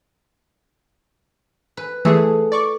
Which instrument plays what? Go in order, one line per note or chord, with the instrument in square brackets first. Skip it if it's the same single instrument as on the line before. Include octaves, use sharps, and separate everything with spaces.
[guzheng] B4
[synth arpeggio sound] E3 A3 G#4 [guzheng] A4
[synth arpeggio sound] D5 C#6 D6